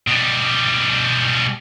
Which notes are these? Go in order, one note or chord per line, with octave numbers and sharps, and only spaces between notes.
B2 G3